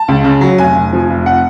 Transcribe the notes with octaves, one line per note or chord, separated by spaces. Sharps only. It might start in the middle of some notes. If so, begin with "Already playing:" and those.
Already playing: A5
C#2
C#3
F#3
F1 G#5
F1
F3
F1
F#5